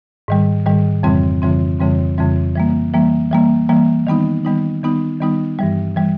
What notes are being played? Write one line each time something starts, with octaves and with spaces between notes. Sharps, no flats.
G#2 D#3 G3
G#2 D#3 G3
F2 C#3 E3 G3 C4
F2 C#3 E3 G3 C4
F2 C#3 E3 G3 C4
F2 C#3 E3 G3 C4
E3 G3 A#3
E3 G3 A#3
E3 G3 A#3
E3 G3 A#3
D#3 G3 B3 D#4
D#3 G3 B3 D#4
D#3 G3 B3 D#4
D#3 G3 B3 D#4
G2 E3 G3
E3 G3